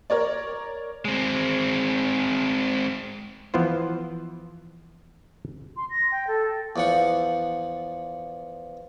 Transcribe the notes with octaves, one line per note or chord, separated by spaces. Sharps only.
A#4 C#5 D5
G#3 C4
E3 F3 B3 E4 F4 C5
C6
A#6
G5
A4
E2 F3 F#5